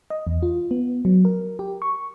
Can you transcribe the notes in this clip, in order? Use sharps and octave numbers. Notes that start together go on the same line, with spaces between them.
D#5
E2
F4
B3
F#3
A#4
G4
C#6